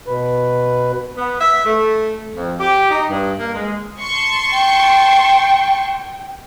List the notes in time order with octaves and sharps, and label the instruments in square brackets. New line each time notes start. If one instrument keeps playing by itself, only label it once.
[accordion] B2 B4
[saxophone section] B3
E5
A3
F2
G4
D#4
G2
A#3
G#3
[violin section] A5 C6 C#6
[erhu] G5